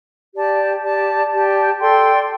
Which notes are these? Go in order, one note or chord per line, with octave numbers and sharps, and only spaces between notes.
G4 D5 A5
G4 D5 A5
G4 D5 A5
A4 D5 G5 C6